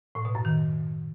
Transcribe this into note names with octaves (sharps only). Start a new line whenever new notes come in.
A2
B2
F#2
D#3